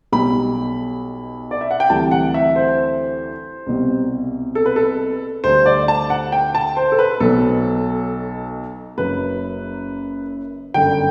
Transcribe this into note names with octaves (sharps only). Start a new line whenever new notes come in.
B1 B2 G3 B5
D5
E5
F#5
G5
D2 C3 E3 G3 A5
F#5
E5
C5
C2 B2 G3
A4
B4
A4
D2 D3 G3 C5
D5
A5
F#5
G5
A5
C5
A4
B4
B1 B2 F#3 A4
F#1 F#2 F#3 B4
G1 F#2 D3 G5